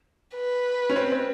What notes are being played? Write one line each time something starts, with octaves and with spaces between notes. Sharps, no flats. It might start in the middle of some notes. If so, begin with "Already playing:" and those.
B4
C#4
C4
C4